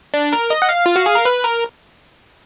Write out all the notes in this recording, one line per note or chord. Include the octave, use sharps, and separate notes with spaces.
D4
A#4
D#5
F#5
F5
F4
F#4
G#4
A#4
B4
A#4